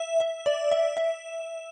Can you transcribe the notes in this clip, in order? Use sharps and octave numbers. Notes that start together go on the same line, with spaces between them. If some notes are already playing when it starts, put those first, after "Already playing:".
Already playing: E5
E5
D5
E5
E5